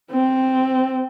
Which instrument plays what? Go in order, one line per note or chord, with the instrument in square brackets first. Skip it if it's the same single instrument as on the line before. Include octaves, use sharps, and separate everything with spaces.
[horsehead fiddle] C4